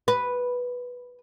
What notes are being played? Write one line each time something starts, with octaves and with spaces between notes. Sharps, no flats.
B4